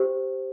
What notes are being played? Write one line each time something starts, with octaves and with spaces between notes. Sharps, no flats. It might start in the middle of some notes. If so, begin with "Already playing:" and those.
Already playing: G4 C5